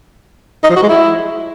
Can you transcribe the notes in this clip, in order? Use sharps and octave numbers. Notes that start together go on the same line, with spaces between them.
D#4
F3
F#4
G#3
E4